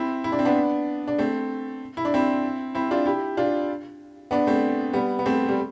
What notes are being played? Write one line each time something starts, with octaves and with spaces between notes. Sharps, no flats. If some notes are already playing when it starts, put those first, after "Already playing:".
Already playing: C4 E4
E4
D4
C4
B3 D4
D4
A3 C4
E4
D4
C4 E4
C4 E4
D4 F4
E4 G4
D4 F4
B3 D4
A3 C4
G3 B3
B3
A3 C4
G3